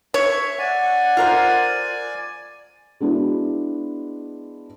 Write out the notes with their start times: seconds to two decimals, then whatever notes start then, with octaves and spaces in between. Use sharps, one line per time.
0.14 C#5 E5
0.59 D5 F#5 G#5
1.17 F4 A#4 C5
3.00 G#3 B3 D4 E4 F#4